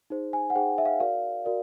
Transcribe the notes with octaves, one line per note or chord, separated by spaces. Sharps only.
D#4 G#4 C5
G#5
F#5
D#4 G#4 C5 G5
E5
F5
F#4 A#4 D5 F5
F#4 A#4 D5